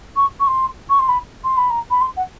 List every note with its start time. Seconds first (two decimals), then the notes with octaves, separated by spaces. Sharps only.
0.16 C#6
0.40 C#6
0.47 C6
0.89 C#6
0.99 C6
1.08 B5
1.44 C6
1.57 B5
1.70 A#5
1.90 B5
2.01 C6
2.17 F#5